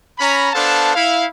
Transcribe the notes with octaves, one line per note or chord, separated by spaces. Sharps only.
C#4 A#5 B5
B3 D4 A4 C5 F5 A5
E4 F5